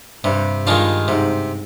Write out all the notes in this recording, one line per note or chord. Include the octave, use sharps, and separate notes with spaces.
G2 C3
G2 D#3 G#3 D4 F4
G#2 C3